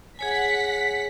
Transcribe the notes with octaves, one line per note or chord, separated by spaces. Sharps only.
G#4 C#5 F#5 G#5 B6